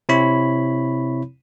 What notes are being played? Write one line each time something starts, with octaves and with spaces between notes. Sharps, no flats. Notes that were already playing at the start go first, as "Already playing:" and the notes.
C3 C4 E4 C#5 B5